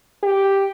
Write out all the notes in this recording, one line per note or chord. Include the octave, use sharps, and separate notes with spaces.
G4